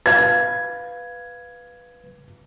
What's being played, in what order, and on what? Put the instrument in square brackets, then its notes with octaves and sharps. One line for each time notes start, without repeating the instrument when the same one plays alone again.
[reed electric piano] B4 F5 [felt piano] G#6